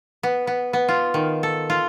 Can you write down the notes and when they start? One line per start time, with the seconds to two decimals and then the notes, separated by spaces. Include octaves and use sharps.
0.23 B3
0.47 B3
0.73 B3
0.88 F4
1.14 D#3
1.43 A4
1.70 F4